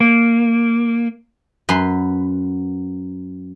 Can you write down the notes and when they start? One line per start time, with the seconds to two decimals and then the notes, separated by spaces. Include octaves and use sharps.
0.01 A#3
1.69 F#2 B4 C6